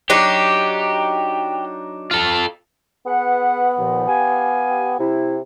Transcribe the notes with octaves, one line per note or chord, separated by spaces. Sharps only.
F#3 D4 D#4 G4
F4 A4
B3 G#4 B4 F#5
D#2 A#2 F3
G4 F5 G#5
C3 E4